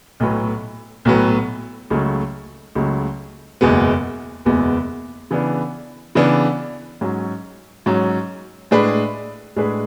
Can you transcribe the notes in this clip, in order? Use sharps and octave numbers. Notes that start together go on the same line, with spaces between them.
B1 A2 F#3 B3
B1 A2 F#3 B3
C#2 C#3 F#3 A3
C#2 C#3 F#3 A3
F#1 E2 B2 G#3 B3
F#1 E2 B2 G#3 B3
C#3 E3 B3 D4
C#3 E3 B3 D4
G#2 F#3 C#4
G#2 F#3 C#4
A2 G#3 D4 G#4 B4
A2 G#3 D4 G#4 B4